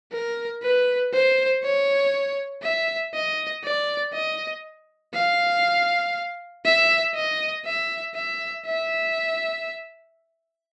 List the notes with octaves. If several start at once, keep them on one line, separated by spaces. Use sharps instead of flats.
A#4
B4
C5
C#5
E5
D#5
D5
D#5
F5
E5
D#5
E5
E5
E5